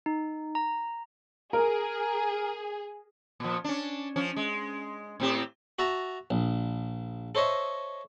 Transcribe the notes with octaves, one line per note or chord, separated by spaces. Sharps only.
D#4
A#5
G#4 A#4
A#2 F3
C#4 D4
F3 C#4
G#3
A2 C4 G4
F#4 E5 A5 A#5
A#1
A4 C5 C#5 D#5 E5